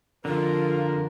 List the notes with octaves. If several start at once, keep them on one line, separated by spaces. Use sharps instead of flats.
F2 D3 F4 A#4